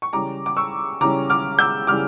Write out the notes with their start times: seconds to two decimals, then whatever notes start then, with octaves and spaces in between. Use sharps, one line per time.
0.02 C#6
0.13 C#3 E3 G3 C#4 A#5 D6
0.46 D6
0.57 C#6 E6
1.01 C#3 E3 G3 C#4 A#5 D6
1.30 D6 F6
1.59 E6 G6
1.87 C#3 E3 G3 C#4 D6 F6